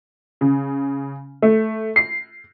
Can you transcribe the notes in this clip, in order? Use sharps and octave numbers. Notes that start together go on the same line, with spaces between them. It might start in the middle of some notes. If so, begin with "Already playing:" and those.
C#3
A3
C7